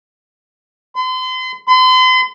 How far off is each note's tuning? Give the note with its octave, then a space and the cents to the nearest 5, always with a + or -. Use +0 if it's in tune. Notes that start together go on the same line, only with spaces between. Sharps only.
C6 -40
C6 -40